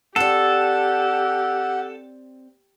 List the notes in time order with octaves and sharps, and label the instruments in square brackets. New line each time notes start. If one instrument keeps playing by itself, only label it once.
[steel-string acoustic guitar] C4 D5 [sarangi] G4 [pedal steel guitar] A4 [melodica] F#5